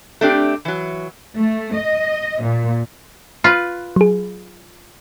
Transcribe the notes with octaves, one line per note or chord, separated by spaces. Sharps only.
A3 C4 D4 G4
E3 F#3
A3
D#5
A#2
F4 B4
F#3 G#4